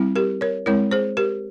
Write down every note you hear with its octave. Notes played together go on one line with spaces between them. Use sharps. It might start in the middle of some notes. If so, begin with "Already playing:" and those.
Already playing: G3 C4 E4
G4 A#4
A#4 C#5
G#3 C4 E4 A#4 C#5
G#4 C5
G4 A#4